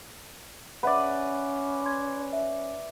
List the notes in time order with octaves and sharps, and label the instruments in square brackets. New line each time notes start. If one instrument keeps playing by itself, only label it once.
[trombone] C#4 [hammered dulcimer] B4 D5 [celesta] E5 F#5
[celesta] C6 G#6
E5